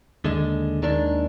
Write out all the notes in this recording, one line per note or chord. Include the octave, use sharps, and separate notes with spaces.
D#2 D3 G#3
D#2 D#3 G#3 D4